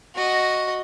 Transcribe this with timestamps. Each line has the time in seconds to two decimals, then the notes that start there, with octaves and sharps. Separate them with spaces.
0.15 F#4 D#5